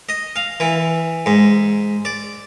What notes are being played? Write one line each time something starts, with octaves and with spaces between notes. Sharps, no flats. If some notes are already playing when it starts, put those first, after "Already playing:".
D#5
F5
E3
G#2
D5